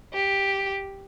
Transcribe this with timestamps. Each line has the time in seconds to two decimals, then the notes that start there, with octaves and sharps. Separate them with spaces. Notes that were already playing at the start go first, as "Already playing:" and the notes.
0.14 G4